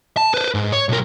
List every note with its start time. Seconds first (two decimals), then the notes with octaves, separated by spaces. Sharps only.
0.17 A5
0.34 B4 C5
0.54 G#2
0.72 C#5
0.89 B1 A#4